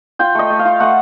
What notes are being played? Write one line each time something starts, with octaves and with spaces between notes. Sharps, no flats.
F4 G5
A3 D#5
A3
F5
F4
A3 F#5